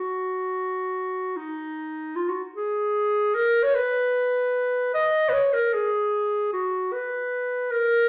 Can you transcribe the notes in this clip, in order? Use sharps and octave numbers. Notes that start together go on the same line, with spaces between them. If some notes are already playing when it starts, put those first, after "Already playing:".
Already playing: F#4
D#4
F4
F#4
G#4
A#4
C#5
B4
D#5
B4
C#5
A#4
G#4
F#4
B4
A#4